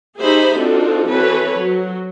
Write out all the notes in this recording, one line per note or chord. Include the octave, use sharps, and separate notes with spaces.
D#4 G4 G#4 C5 E5 B5
C4 D4 D#4 F4 F#4 A4
E3 C4 F#4 A4 B4 C#5
F#3